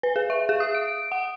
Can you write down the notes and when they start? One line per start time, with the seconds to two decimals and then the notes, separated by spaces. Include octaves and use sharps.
0.03 B4
0.16 G#4
0.30 E5
0.49 G#4
0.60 D#6
0.75 D7
1.12 F#5